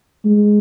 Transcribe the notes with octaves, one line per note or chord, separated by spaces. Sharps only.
G#3